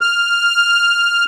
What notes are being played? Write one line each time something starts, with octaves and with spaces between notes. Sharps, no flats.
F6